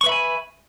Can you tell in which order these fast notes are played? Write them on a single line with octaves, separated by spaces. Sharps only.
C#6 B4 E5 B5 G#5